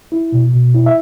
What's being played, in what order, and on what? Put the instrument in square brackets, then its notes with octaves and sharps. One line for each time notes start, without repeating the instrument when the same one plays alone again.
[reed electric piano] E4
B2
B2
E4
E5